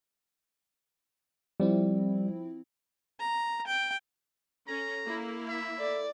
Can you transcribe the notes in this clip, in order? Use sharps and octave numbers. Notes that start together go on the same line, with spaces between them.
F3 G3 C4 E4
A#5
G5
C#4 A4 A#5
A#3 E4
E5
A4 D5